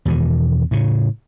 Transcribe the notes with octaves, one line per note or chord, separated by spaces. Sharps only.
E2 B2 D#3
A2 C#3